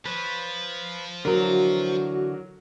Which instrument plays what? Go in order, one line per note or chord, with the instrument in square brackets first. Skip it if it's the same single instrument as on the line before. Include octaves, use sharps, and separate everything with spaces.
[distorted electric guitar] F3 [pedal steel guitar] B4 C#5
[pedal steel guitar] D3 E3 A#5 [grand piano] F#3 A#4 [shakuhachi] F#4